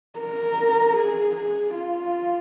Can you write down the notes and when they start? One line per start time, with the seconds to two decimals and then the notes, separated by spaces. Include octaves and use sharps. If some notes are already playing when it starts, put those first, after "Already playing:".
0.20 A#4
0.97 G#4
1.35 G#4
1.75 F4